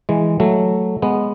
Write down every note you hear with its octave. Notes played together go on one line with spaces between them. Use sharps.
E3 G#3
F#3 A3
G#3 B3